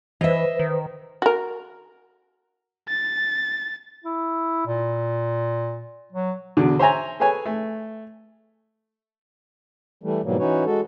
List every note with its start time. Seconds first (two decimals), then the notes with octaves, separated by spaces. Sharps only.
0.21 E3 B4 C5 D#5 E5
0.59 D#3
1.22 F#4 A#4
2.89 A6
4.05 E4
4.67 A#2
6.13 F#3
6.57 E2 B2 D3
6.79 C5 C#5 E5 G#5 A#5
7.20 G#4 A4 B4 C#5 G#5
7.46 A3
10.03 E3 G3 A3
10.24 G#2 B2 E3 F#3 G3 A#3
10.39 E3 C#4 D#4 F#4 B4 C#5
10.65 G#3 F#4 A4